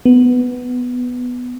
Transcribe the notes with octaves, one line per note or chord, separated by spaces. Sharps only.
B3